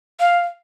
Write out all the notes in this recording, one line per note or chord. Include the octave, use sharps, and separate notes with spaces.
F5